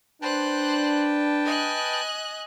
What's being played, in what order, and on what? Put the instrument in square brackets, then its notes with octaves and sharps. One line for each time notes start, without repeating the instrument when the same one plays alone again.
[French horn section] D4 [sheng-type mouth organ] B4 G5 A5 [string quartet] C5 F#6
[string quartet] D#5 G#5 F#6